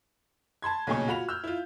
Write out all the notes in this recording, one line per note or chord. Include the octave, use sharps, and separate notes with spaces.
A5 B5 C6 G#6
B1 A#2 C#3 G#5 C#6
F4 F#4 B5 F7
E6 F6 G6
E4 F4